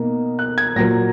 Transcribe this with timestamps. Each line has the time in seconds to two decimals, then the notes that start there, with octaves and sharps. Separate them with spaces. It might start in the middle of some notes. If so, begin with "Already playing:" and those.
Already playing: B2 A#3 D#4
0.39 F#6
0.58 G#6
0.76 A#2 F#3 A#3 A#6